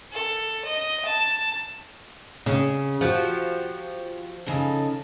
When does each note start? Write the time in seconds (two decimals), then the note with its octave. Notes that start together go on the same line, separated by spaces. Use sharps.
0.12 A4
0.65 D#5
1.05 A5
2.46 C#3
3.01 F3 F#4 G4 C5
4.46 C#3 D#4 A4